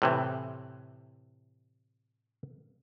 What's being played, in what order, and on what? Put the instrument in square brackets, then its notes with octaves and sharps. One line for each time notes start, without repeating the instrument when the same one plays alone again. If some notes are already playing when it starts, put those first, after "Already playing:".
[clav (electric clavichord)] A2 C3 E3